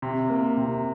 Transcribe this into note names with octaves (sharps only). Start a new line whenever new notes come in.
C3
A#3
C3